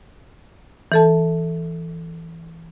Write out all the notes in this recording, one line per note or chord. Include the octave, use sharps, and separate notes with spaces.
E3 A4 A5